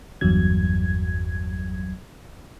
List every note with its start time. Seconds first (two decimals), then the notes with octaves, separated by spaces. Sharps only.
0.21 G1 E2 G2 F#3 G#6